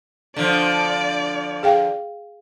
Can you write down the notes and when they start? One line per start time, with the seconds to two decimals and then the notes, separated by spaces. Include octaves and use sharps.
0.36 D3 F3 D5
1.63 G#4 F5 G5